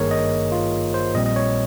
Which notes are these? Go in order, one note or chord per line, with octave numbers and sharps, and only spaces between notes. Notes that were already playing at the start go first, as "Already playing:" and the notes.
Already playing: G#1 G2 D#3 A#3 G#4 A#4 C#5
D#5
F4
C5
A#1 A#2 G3 C4 D#5
D#5
C#5